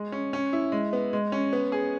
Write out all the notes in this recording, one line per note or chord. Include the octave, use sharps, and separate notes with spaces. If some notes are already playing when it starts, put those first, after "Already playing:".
Already playing: G#3 G#4
C#4
C#4
E4
G#3
B3
G#3
C#4
B3
G#4